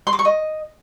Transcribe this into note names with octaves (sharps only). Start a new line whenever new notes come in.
C6
D6
C#6
D#5